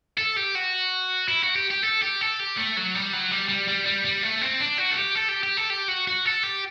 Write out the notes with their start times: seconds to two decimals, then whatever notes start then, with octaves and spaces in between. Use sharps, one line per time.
0.18 A4
0.37 G4
0.55 F#4
1.28 E4
1.42 F#4
1.56 G4
1.70 G4
1.83 A4
2.02 G4
2.21 A4
2.39 G4
2.57 A3
2.76 F#3
2.95 G3
3.13 F#3
3.31 G3
3.49 G3
3.68 G3
3.86 G3
4.05 G3
4.23 A3
4.41 C4
4.60 D4
4.78 F#4
4.91 A4
4.96 G4
5.15 A4
5.28 G4
5.43 G4
5.57 A4
5.70 G4
5.88 F#4
6.08 F#4
6.25 A4
6.43 G4